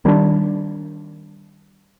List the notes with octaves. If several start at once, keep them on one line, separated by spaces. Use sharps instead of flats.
D#3 G3 A#3 D4